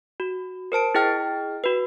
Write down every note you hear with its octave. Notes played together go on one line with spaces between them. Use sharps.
F#4
A#4 C5 A5 D7
E4 G#4 D#5 G5 F6 A6
F#4 B4